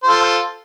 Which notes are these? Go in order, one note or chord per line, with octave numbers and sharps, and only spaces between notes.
F4 A4 C5